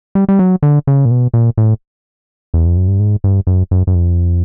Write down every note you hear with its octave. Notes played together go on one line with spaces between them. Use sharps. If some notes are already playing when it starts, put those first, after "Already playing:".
G3
G3
F#3
D3
C#3
A#2
B2
A#2
A2
E2
F2
F#2
G2
G#2
G2
F#2
F#2
F#2
F2